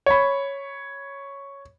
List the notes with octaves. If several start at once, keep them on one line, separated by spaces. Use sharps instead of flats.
C#5 B5